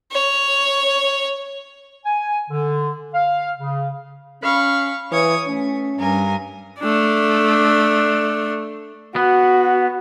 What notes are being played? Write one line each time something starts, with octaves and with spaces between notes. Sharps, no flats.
C#5
G#5
D3
F5
C#3
C#4 F5 B5 C#6
E3 C#5 D#6 G#6
A3 C#4
G2 A#4 G#5
A3 D4
B3 F#4